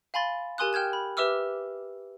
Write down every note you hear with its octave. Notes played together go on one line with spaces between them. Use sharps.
F5 G#5 B5 C6 A6
G4 A#4 G#5 C6 D#6 F#6
G5 F6 G6 G#6 E7
B5
G4 B4 E5 D6 E6 F6